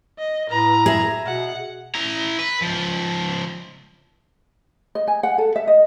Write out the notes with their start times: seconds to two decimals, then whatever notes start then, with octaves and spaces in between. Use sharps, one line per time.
0.19 D#5
0.50 A2 B4 A#5
0.86 G#4 E5
1.26 B2 F#5
1.95 E4 A#5
2.39 B4
2.62 C#2 F3
4.95 D#5
5.08 G#5
5.23 F#5
5.38 A4
5.56 E5
5.67 D#5